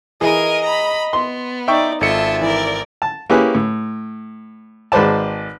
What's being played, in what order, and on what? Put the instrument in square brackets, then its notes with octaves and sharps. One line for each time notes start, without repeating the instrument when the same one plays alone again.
[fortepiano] E3 G#4 [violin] A#4 D#7 [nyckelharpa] D#5
[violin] A#5 B5
[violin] B3 [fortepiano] C6
[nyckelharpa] D#4 D5 [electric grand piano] E5 G5 C#6
[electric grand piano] G#1 A4 C#7 [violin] F4 A5 [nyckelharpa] E5
[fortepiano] E3 [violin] A#4 D5
[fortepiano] A5
A#3 C#4 E4 G4 G#4 B4
A2
G#1 G#3 B4 C5 D5 A5